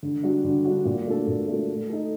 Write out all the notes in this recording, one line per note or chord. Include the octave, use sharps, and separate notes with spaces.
D3
G3 D4 F#4
D3
G3 D4 F#4
A#2
A3 D4 F#4 A4
A#2
A3 D4 F#4 A4
A3
D#4 A4